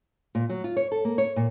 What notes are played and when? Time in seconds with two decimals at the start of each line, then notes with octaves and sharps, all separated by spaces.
0.35 A#2
0.49 F#3
0.64 F4
0.77 C#5
0.92 A4
1.05 A#3
1.18 C#5
1.36 A#2